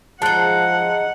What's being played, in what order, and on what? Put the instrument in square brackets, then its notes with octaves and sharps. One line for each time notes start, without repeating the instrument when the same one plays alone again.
[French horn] F3 [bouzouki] G#3 D#4 [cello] F#5 [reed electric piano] A5 F#6